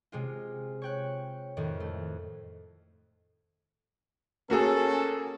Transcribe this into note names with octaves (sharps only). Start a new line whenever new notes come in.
C3 G#3 F4
C#5 G5 F#6
F2 A2 D#3
A3
A#3 C#4 F#4 G#4 A4